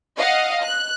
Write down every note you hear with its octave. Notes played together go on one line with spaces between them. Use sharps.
D#5 F5 F#5
F#6